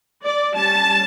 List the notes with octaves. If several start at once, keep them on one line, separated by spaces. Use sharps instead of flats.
D5
G3 C#4 A5